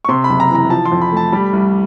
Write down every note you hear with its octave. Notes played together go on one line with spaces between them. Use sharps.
C#6
C3 C6
B5
F#1
A#5
E3 A#5
F3 A5
C6
F2
B5
A3 A5
G3 B5
C2